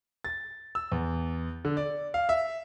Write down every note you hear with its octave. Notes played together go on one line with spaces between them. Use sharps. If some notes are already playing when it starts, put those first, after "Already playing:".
A6
E6
E2
D3
D5
F5
E5